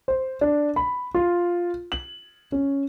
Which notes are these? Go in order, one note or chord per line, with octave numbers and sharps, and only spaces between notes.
C5
D4
B5
F4
F#7
C#4